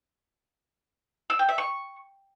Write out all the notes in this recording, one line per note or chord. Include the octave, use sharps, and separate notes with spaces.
E6
G5
E5
C#6